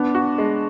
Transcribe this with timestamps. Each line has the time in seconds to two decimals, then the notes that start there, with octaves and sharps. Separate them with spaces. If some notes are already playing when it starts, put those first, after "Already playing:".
Already playing: B3 D4
0.15 F#4
0.38 G#3